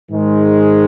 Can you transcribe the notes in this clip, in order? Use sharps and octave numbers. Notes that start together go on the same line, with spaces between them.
G#2 D#3 G#3